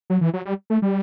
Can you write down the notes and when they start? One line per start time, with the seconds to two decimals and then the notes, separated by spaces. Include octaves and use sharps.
0.10 F#3
0.21 E3
0.33 F#3
0.45 G3
0.70 A3
0.82 G3